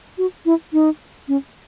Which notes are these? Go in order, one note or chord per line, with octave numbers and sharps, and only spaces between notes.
F#4
E4
D#4
C#4